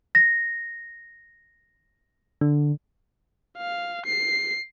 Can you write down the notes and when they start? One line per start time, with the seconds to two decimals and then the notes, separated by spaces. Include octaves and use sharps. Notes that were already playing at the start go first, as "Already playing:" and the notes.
0.15 A#6
2.41 D3
3.58 F5
4.06 C7